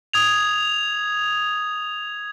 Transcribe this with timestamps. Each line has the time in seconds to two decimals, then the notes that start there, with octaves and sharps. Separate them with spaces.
0.13 D#6 G#6 F7